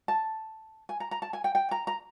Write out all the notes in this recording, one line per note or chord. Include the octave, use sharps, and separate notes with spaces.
A5
G#5
A#5
A#5
A5
G#5
G5
G5
A#5
A#5